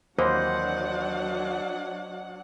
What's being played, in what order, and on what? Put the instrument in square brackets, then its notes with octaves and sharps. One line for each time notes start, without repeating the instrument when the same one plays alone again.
[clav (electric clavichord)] D#2 E3 A#3 [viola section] F#3 D4 F#5 [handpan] C5 [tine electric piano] D#5